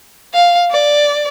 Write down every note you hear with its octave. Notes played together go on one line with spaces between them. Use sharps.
F5
D5